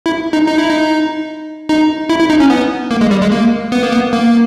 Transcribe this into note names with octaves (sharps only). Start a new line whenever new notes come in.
E4
D#4
D#4
E4
D#4
D#4
E4
E4
D#4
C#4
B3
A#3
G#3
G3
G#3
A#3
B3
A#3
B3
A#3